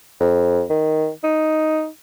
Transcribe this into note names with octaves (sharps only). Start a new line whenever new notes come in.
F2
D#3
D#4